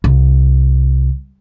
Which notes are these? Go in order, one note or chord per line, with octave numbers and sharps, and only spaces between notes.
C2